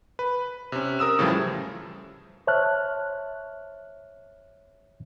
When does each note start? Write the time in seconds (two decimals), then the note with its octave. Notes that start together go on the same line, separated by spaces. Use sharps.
0.19 B4
0.72 C3 C#4
0.99 A#4 D#6 E6 E7
1.19 A2 C#3 E3 F3 G3
2.47 C5 C#5 E5 A5 F6 F#6